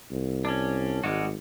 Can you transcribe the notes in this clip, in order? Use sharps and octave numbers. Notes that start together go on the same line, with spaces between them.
C2
C#4 D4
G#1 G3 G#3 F#4